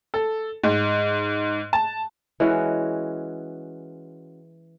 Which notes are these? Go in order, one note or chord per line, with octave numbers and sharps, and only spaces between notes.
A4
G#2
A5
E3 G#3 C#4 F#4